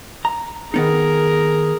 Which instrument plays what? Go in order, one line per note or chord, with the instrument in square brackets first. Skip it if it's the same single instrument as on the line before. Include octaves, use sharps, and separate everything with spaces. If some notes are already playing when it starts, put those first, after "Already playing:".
[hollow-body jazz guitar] A#5
[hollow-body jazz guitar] D#3 B3 D#4 [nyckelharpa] G#4 A#4